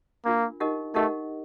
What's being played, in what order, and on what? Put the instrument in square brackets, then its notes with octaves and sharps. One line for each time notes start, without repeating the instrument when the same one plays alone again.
[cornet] A#3 [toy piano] D4 F4 A#4
[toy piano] D#4 G4 A#4 D#5 F#5
[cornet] A3 [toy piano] D#4 G4 A#4 D#5 F#5